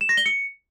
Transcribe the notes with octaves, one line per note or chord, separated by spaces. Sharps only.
E7
A#6
G7
C#7